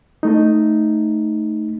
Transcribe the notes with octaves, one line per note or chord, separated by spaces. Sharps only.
A3 D#4